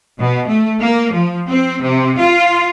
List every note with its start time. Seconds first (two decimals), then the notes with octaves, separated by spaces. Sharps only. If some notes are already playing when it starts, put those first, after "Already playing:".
0.19 B2
0.48 A3
0.80 A#3
1.13 F3
1.48 C4
1.82 C3
2.19 F4